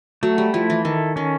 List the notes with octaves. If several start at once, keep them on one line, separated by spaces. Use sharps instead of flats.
F#3 A3
G3
F3 E4
E3
D#3 A4
D#3 C#4